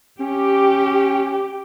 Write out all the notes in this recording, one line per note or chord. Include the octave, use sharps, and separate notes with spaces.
C#4 G4